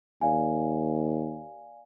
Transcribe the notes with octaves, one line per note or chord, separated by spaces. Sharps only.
D#2 D5 F5 G#5